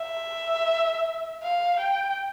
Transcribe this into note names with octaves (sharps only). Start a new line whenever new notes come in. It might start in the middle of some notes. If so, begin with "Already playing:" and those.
Already playing: E5
F5
G5